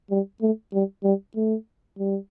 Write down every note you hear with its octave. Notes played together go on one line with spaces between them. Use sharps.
G3
A3
G3
G3
A3
G3